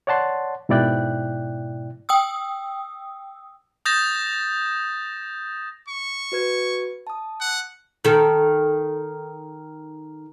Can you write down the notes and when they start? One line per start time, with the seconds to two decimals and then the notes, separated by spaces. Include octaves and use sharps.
0.07 C#5 D5 F#5 A5 C6
0.69 G#2 B2 E4 D5 G5 F#6
2.09 G5 D#6 E6
3.85 D#6 G6 A6 A#6 E7
5.88 C#6
6.32 F#4 B4 G#6
7.07 A5 D#6
7.40 F#5
8.05 D#3 A4